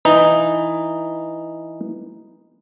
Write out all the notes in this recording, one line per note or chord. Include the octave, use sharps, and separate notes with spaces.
E3 D#4